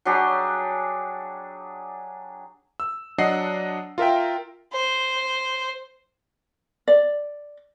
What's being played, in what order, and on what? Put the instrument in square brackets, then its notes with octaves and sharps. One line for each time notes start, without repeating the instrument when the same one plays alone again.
[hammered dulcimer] F#3 D4 G4 G#4
[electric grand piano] E6
F#3 D4 D#5 F#5 C7
F4 A#4 E5 G5
[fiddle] C5
[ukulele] D5